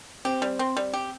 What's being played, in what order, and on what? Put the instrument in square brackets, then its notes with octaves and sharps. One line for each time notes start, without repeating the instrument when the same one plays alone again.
[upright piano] C4 [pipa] G4
[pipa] G3
C4
G3
G4